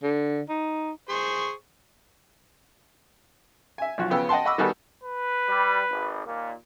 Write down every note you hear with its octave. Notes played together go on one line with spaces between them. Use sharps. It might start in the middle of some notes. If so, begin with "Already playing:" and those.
D3
D#4
G#4 C5 C#6
E5 G#5
B1 F3 F#4
C#3 F3 B3 G5 G#5 E6
D#5 F#5 G5 A5 C6
D#5 F#5 B5 C#6 D6 E6
D#3 G3 B3 F#4 G#4 A4
B4
G3
G#1
D#2 A#2